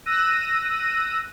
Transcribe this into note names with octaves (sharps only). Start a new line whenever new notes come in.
E6 F#6 A#6 D#7